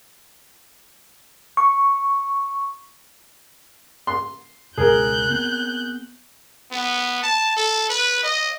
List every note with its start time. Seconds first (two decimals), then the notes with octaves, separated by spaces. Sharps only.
1.57 C#6
4.07 C6
4.78 C#2 B2 G#4 A#4 F#6 G6
5.30 B3 C4
6.72 B3
7.23 A5
7.57 A4
7.90 B4
8.24 D#5